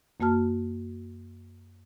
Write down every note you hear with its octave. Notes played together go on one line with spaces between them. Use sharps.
F#2 A#3 F#4 A5 F6